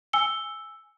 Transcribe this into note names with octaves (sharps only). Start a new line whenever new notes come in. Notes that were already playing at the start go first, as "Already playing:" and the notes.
G#5 E6 C#7 G7